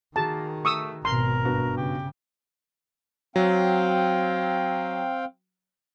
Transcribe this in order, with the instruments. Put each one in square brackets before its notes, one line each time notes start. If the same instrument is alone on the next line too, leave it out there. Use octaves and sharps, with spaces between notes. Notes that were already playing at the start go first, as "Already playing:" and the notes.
[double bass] D#3 [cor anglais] A#3 [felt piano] F#4 G#4 [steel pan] A5
[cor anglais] A3 [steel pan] C#6 D#6 E6
[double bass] G#1 B2 [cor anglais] A#4 [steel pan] C6
[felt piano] G2 B3 F#4
[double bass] C#3 [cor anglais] G4
[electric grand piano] F#3 [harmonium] C4 F5 G5